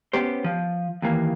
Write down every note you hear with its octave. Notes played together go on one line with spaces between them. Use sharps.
B3 C#4 G4 C5
F3
D#2 E3 A#3